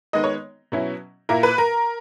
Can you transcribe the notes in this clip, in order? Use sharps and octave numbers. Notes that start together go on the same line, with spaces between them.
D#3 G#3 B3 D#4 D#5
C#5
B2 F#3 C#4 E4
A#2 A#3 E4 A#4
B4
A#4